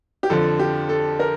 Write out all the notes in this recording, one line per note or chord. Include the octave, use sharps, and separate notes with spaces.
G4
F2 D3 F3 A4
G4
A4
A#4